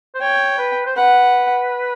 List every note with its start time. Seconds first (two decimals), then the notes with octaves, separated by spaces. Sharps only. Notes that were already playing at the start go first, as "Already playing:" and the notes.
0.15 C5
0.21 C#5 G5
0.58 B4
0.86 C5
0.96 B4 F#5